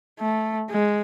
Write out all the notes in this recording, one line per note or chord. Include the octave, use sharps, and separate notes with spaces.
A3
G#3